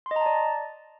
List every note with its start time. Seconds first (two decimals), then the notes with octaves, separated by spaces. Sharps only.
0.06 C6
0.11 D#5
0.16 A#5
0.21 A5
0.26 D5